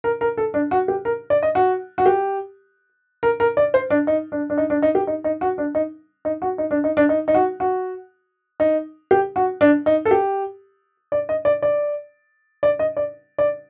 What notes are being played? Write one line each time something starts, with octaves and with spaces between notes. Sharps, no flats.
A#4
A#4
A4
D4
F#4
G4
A#4
D5
D#5
F#4
F#4
G4
A#4
A#4
D5
C5
D4
D#4
D4
D4
D#4
D4
D#4
G4
D#4
D#4
F#4
D4
D#4
D#4
F#4
D#4
D4
D#4
D4
D#4
D#4
F#4
F#4
D#4
G4
F#4
D4
D#4
A4
G4
D5
D#5
D5
D5
D5
D#5
D5
D5